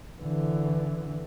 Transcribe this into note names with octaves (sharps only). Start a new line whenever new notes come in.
D3 E3